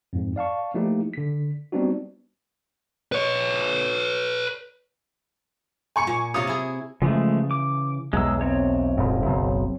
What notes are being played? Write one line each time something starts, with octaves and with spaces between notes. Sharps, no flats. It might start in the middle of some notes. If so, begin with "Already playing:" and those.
F2 G#2
D5 F5 A5 C#6
F3 A3 A#3 D#4 E4 G4
D3 B6
G3 B3 C4 D4 D#4 F#4
B4 C#5
G#5 C#6 C#7
A#2
C3 F4 C#5 D#6
E4 G#4
C#3 E3 F3 G#3 A3
D6
B1 E2 G#3 E6
C4 C#5
D#1 G#1 F#2
F#1 B1